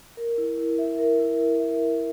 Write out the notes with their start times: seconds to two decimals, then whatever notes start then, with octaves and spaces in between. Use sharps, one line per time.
0.17 A#4
0.38 E4
0.58 E4
0.78 E5
0.99 A#4
1.20 E4
1.40 E4
1.59 E5
1.81 A#4